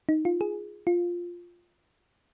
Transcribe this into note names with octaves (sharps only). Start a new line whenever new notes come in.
D#4
F4
G#4
F4